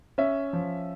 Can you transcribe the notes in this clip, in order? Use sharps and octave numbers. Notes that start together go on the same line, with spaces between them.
C#4 E5
F3